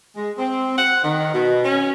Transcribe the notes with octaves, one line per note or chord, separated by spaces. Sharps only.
G#3
C4
F#5
D#3
B2
C#4